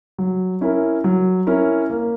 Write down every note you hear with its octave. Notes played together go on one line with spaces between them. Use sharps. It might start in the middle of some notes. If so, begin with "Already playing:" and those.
F#3
C#4 E4 A#4
F#3
C#4 E4 A#4
A#3